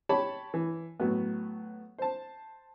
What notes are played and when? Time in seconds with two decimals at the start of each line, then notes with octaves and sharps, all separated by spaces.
0.09 G4 C#5 A5 B5
0.54 E3
1.00 A2 F#3 B3
1.98 C5 A5